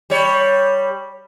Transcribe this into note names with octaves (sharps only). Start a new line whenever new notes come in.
G3 C#5